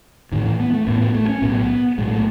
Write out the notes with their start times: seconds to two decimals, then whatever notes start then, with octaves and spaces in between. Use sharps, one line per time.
0.32 A1 A2 D#3
0.45 E3
0.60 B3
0.73 A3
0.86 A1 A2 B3
1.01 B3
1.15 A3
1.29 C#4
1.42 B1 A2 B3
1.98 B1 A2 G#3
2.11 A3